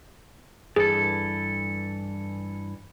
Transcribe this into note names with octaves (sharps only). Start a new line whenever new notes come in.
G2 E3 G#4 A4